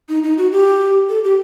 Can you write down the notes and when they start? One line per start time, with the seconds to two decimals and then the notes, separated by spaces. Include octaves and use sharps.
0.09 D#4
0.23 D#4
0.38 F#4
0.52 G4
1.09 A4
1.24 G4